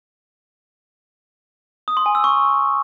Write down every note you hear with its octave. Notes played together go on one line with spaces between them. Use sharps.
D#6
C6
G#5
E6
C#6